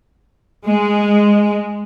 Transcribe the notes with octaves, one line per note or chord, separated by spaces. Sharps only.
G#3